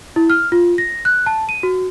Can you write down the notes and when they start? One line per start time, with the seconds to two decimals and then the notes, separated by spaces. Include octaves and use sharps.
0.16 E4
0.30 F6
0.52 F4
0.78 A#6
1.05 F#6
1.26 A5
1.49 D#7
1.63 F#4